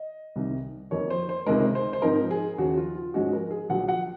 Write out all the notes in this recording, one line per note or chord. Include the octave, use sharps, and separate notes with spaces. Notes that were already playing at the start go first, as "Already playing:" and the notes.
Already playing: D#5
C2 C3 D#3
F2 D#3 A#3 D#4 C#5
C5
C5
C#2 C3 D#3 G#3 A#4
C5
C5
G#2 F3 C4 D#4 A#4
G#4
D#2 C#3 F3 F#4
F4
F4
G#2 F3 G#3 C#4 F#4
A#4
G#4
A#1 A#2 F#3 F#5
F#5